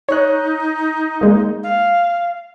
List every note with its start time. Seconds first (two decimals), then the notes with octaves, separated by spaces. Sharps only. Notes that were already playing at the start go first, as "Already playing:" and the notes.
0.09 D#4 C#5 F#6
1.21 G#3 A#3
1.63 F5